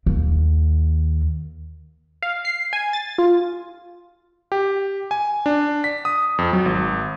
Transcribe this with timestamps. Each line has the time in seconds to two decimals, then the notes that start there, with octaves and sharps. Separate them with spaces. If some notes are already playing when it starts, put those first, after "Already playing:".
0.06 D#2
2.23 F5
2.45 C7
2.73 G#5
2.93 A6
3.18 F4
4.52 G4
5.11 G#5
5.46 D4
5.84 B6
6.05 D#6
6.38 F2
6.53 F#3
6.66 G#1